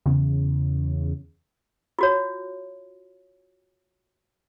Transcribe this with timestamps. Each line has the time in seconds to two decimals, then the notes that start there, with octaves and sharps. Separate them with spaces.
0.06 E2 C#3
1.99 F4 F#4 C#5